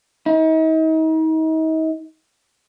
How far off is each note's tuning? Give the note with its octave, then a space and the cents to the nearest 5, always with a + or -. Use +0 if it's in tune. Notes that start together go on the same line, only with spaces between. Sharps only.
D#4 +40